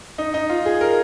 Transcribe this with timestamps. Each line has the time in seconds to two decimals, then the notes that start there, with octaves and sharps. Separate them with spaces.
0.18 D#4
0.34 D#4
0.50 F4
0.66 G#4
0.81 A#4